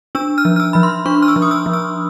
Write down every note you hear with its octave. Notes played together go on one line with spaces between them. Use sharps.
D4 E6
F6
F3
F6
E6
F3 B5
C6
D4 C#6
F6
E6
F3
D#6
E6
F3
E6